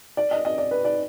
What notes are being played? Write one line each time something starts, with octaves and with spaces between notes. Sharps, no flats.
D5
D#5
D#5
D5
B4
D5